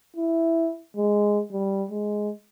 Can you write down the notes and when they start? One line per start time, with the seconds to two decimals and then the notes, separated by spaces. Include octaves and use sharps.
0.16 E4
0.96 G#3
1.52 G3
1.90 G#3